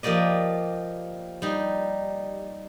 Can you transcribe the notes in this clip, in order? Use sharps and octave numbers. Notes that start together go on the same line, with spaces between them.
F3 A#3 G4 D5 D#5
G3 D#4